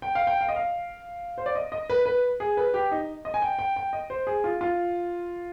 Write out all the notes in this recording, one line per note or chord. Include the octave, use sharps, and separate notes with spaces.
G5
F5
G5
F5
D#5
F5
C5
D5
D#5
D#5
B4
B4
G#4
B4
G4
D#4
D#5
G#5
G5
G5
G5
D#5
C5
G#4
F4
F4